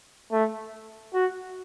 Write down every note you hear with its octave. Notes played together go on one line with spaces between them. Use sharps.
A3
F#4